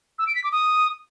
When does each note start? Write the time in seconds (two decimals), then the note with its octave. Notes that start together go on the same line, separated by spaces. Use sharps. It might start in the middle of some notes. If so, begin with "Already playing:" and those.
0.19 E6
0.27 D7
0.35 B6
0.44 D6
0.52 D#6